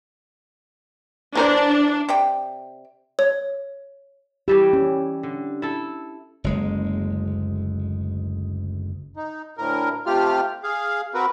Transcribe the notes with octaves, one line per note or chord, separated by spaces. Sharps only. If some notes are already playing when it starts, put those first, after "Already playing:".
E3 D4 A#4 C5
C3 D5 G5
C#5
E3 G3 E4 G4
C#4
D3
E4 A4
F#1 D2 G#3
D#4
D2 A2 A#4
C3 A3 F4 G4 F6
G#4 F5
C4 F#4 A#4 B4